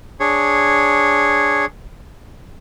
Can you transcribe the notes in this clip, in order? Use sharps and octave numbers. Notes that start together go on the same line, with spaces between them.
D4 G#4 C#5